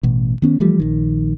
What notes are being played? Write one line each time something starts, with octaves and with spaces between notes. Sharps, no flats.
A1 B2
D#3 B3 C#4
E3 F3 G3 A3
A#1 D#3